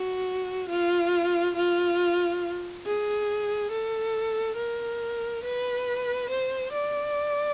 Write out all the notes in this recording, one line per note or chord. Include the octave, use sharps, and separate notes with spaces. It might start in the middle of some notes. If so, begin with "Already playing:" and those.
Already playing: F#4
F4
F4
G#4
A4
A#4
B4
C5
D5